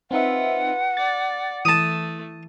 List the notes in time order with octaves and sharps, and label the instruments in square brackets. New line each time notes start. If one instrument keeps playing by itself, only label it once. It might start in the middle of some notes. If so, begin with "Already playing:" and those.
[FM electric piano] C4 D#4 E5 [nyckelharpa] F4 B4 [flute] F#5
[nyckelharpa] D5 [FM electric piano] A6
[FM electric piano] E3 [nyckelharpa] A3 [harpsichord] A5 D#6